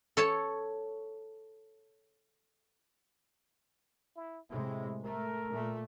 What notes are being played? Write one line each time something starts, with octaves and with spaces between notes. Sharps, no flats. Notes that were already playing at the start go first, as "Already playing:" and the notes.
A4 C#5 A5
E4
A2 C3 G#3 E4
A3 A#4
A#2 A3